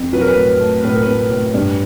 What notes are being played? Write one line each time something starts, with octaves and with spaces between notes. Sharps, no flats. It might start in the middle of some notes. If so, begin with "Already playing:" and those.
Already playing: F2
F#3 B4
A#4
B4
A2
A3
A2 B4
A#4
A2 B4
A2
G2